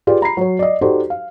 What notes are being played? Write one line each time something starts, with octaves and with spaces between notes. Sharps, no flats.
F4 G4 G#4 B4 D5 G5
A#5 B5 C7
F#3 C#5
D5 D#5
D#4 F#4 G4 A4 C5 D5
F5